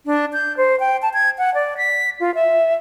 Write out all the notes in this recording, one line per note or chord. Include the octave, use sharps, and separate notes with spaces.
D4
G6
C5
G5
A5
G#6
F#5
D5
B6
F4
E5